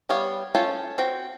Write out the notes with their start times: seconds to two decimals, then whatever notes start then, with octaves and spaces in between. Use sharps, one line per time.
0.09 G3 B3 G4 C#5 F5
0.55 C#4 F4 A4 C#5 G5
0.98 C4 F#4 G5